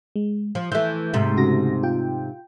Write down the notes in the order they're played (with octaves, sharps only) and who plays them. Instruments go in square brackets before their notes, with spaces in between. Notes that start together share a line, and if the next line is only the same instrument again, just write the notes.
[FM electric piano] G#3
[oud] F3
[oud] E3 A3 [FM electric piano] E5 G6
[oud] G#2 C3 A3
[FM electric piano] C#3 F#4 A#6
F4 G5